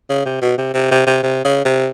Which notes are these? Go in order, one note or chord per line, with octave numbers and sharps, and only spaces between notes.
C#3
C3
B2
C3
C3
C3
C3
C3
C#3
C3